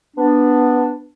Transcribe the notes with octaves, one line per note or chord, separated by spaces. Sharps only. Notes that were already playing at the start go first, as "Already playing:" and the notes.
B3 D4